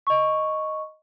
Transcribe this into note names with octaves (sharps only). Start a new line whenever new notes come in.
D#5 C#6